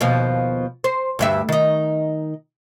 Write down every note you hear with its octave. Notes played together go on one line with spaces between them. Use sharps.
D#2 B2 F3
C5
D2 G2 E5
D#3 D#4